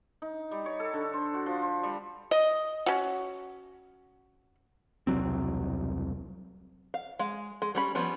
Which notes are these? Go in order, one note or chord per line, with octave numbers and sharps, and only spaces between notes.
D#4
G3
C#5
A4
D3
C5
F#4
F3
C5
G3
D#5
C#4 F#4
E1 C2 F#3 C4
F5
G#3 F5
G#3
G3 C#4 B5
F3 G3 B3 C#4